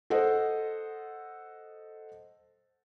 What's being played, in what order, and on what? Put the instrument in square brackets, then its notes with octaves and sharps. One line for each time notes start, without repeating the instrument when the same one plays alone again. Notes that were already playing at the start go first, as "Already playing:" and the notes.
[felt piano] A4 C5 D#5 F#5